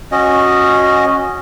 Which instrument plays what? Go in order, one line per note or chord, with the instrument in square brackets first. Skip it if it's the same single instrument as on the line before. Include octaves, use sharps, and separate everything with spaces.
[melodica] C#4 F#4 D#5